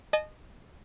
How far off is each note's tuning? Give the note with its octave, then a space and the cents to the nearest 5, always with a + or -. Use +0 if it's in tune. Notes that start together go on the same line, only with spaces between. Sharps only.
D#5 -20 A5 -40